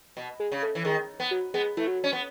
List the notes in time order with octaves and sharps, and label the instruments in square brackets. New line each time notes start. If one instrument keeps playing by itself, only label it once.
[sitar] B2
[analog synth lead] G#3
[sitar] C#3
[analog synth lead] A3
[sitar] E3
[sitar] D#3 [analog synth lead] G#3
[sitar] B3
[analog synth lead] F#3
[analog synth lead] G#3 [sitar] B3
[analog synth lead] E3 [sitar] A3
[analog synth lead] F#3
[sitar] C#4
B3